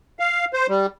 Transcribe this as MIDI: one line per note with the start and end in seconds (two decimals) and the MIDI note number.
0.19 0.45 77
0.53 0.67 72
0.69 0.86 55